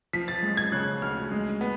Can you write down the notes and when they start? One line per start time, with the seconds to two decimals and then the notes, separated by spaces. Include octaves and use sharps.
0.13 F3 B6
0.28 A6
0.43 G#3
0.57 G#6
0.72 C#3 F#6
1.02 D2 F6
1.32 G#3
1.61 B3